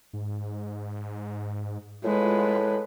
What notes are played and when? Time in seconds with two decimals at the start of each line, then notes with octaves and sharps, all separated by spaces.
0.13 G#2
2.04 A2 G#3 F4 B4